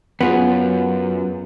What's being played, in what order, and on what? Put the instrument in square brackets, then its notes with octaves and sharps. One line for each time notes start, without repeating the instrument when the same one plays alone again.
[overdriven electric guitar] F#2 [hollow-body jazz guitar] B3 F4 G#4